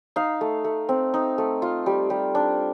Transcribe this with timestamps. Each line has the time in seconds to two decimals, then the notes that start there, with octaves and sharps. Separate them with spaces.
0.16 D#4 F5
0.41 A3
0.64 A3
0.89 C4
1.14 D#4
1.38 A3
1.62 F4
1.86 G3
2.10 G3
2.35 D4